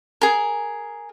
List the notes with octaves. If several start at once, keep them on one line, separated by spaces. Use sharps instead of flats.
G#4 A#4